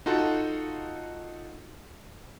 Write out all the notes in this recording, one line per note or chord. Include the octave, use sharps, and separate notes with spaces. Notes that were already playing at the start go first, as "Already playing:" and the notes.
D#4 F4 F#4 A4